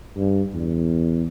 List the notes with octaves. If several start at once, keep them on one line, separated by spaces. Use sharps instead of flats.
G2
E2